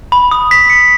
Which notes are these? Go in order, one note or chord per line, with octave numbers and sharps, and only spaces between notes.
B5
D#6
B6
C#7